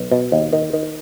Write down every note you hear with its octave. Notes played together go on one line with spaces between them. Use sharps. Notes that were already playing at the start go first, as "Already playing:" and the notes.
Already playing: B1
B2
D#2
D#3
D#3